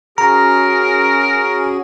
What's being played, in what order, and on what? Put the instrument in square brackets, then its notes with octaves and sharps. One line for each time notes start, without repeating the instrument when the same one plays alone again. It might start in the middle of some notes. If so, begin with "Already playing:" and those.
[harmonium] C#4 F#4 G#4 [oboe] A#4 [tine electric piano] A#5